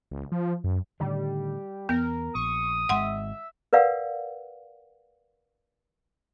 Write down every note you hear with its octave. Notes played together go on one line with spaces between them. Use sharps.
C#2
F3
F#2
A2 D3 D#3 G3
E2 B3 A#4
A#1 C#6 D#6
G#1 G#3 E5 F#5 C6
A#4 B4 D5 F5 F#5